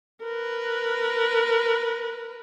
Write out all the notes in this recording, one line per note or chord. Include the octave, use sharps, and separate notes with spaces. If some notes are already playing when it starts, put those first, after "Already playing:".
A#4 B4